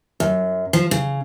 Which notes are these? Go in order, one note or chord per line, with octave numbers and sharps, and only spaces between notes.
F#2
F3
C#3